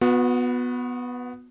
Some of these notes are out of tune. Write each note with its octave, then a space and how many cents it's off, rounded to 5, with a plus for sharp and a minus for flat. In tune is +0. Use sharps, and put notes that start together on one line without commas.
B3 +0 F#4 -35